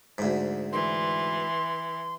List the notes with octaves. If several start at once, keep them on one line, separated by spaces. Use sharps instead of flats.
D2 G#2
E3 C6